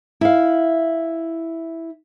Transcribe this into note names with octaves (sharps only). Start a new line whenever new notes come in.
E4 F5